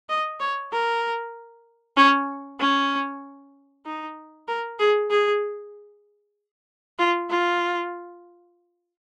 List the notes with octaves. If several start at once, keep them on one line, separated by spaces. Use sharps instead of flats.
D#5
C#5
A#4
C#4
C#4
D#4
A#4
G#4
G#4
F4
F4